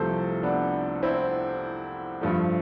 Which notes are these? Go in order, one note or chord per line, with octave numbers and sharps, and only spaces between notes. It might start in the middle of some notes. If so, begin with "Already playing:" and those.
Already playing: C2 C3 F3 A3 A4 C5
B3 D4
C4 E4
G2 F3 A3